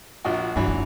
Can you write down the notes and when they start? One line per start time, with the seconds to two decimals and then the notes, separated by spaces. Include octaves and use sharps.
0.25 A#1 F4 F#4
0.56 G2 D3 E3 F#3
0.67 F#1